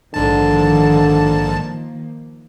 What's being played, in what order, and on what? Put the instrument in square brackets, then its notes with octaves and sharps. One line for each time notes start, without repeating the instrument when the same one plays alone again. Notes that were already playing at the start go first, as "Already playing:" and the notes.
[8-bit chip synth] A#1 G#2 A5 [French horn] D3 [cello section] D#3 F3 A#3